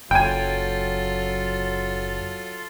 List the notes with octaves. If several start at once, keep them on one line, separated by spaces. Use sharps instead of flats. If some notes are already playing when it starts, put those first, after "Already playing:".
F#1 F#3 F4 A4 G5 G#5